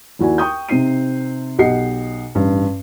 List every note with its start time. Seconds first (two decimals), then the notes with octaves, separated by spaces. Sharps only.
0.19 D#2 E4 F#4 D5 G#5
0.38 G5 C#6 D#6 G6
0.69 C3 C4 D#4 C7 D#7
1.58 B1 G4 D#5 F#5 C7 C#7
2.35 A1 G2